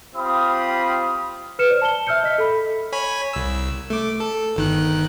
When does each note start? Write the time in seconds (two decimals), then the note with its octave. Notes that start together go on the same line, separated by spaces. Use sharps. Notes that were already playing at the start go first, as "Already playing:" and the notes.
0.16 C4 F4 G4 B5 D#6
1.59 B4 F6 C#7 E7
1.70 C5 D5
1.82 A5 G7
2.07 E5 E6 F6 G6 C#7
2.23 D#5 B6
2.38 A4 B5
2.92 C#5 G#5 B5
3.33 C2 E6
3.90 A3 D6
4.20 A4
4.56 G1 D#3 F#6